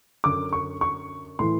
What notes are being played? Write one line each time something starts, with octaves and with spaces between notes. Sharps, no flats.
F#2 D3 D6
C#6
C#6
A2 E3 C6